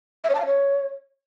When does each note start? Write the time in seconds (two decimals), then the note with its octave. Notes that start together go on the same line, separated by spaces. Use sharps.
0.24 E5
0.29 C#5
0.35 A5
0.40 F5
0.46 C#5